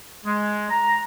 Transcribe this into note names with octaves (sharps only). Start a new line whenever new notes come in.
G#3
A#5